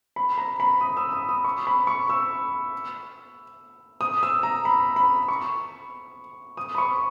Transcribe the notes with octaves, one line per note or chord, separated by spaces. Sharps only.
B5
A#5
B5
D#6
E6
D#6
D#6
C#6
B5
C#6
E6
D#6
E6
A#5
B5
B5
C#6
D#6
B5
C#6